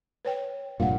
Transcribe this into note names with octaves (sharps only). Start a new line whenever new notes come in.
B4 C#5 G5
F1 G2 A#2 F5 F#5